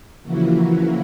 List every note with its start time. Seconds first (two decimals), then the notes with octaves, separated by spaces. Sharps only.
0.22 C#3 E3 F3 A#3 E4 F#4